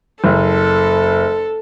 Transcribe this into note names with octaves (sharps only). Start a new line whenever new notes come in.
F#1 A4